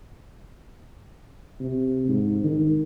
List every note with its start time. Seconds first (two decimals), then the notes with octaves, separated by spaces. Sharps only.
1.61 C3
2.08 G#2
2.44 D#3